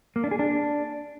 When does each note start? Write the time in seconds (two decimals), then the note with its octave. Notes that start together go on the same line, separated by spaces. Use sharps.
0.16 A#3
0.24 D4
0.31 G#4
0.39 D4